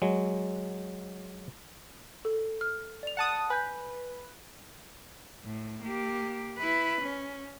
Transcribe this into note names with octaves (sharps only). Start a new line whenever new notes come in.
F#3 G#3
A4
F6
D5 F7
F#5 A5 D#6
B4 G#5 G6
A2
A#3 G4
E4 B4
C#4